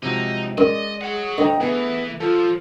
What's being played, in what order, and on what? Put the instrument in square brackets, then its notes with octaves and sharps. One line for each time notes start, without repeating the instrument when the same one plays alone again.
[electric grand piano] C3 F3 F#3 [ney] G#3 [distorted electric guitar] D#4
[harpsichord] F#2 [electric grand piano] G#3 [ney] D5 [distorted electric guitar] D#5
[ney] G#4 [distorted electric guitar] C#5 F#5
[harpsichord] D2 [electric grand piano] D#5 A#5 [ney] G5
[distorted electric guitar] E3 [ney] A3 [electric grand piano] B3 G#4
[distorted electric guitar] F3 [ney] F4 [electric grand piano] A4